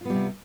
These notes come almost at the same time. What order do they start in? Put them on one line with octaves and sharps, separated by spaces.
F4 B3 G3 C3